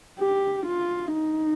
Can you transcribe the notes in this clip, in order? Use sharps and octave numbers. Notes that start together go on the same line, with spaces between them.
G4
F4
D#4